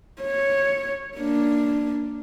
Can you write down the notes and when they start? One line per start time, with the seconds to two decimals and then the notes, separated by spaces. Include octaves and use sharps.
0.22 C#5
1.18 A#3 D4